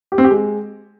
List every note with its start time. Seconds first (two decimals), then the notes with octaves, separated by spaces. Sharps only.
0.12 G4
0.18 C4
0.24 G4
0.31 G#3